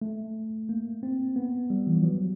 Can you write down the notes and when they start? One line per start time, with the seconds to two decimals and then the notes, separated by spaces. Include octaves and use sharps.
0.02 A3
0.69 A#3
1.03 C4
1.36 B3
1.70 G3
1.87 E3
1.95 F3
2.03 F#3